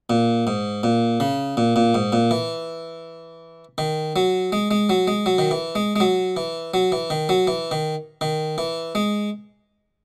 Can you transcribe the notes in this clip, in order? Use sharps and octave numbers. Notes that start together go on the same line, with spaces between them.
A#2
G#2
A#2
C#3
A#2
A#2
G#2
A#2
E3
D#3
F#3
G#3
G#3
F#3
G#3
F#3
D#3
E3
G#3
G#3
F#3
E3
F#3
E3
D#3
F#3
E3
D#3
D#3
E3
G#3